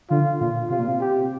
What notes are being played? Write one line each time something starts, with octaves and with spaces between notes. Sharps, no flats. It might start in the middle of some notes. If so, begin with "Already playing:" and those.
D3 F4
A#2 F4
C3 F4
A#2
C3
G4